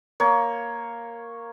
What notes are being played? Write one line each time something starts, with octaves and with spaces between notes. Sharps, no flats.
A#3 C#5